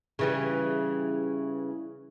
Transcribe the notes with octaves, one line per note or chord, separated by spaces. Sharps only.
C#3 E3 G3